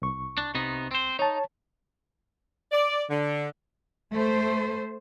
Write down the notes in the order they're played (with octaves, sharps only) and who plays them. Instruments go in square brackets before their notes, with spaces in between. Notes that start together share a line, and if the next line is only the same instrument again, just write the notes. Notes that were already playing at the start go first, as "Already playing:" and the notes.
[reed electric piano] C2 C#6
[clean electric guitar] D4
C3 B3 D#4
C4 C5
[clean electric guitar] D#4 [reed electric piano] C#5 A5
[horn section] D5
D3
[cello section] A3 C5